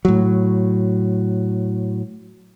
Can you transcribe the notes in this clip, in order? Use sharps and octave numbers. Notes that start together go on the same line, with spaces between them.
A2 F#3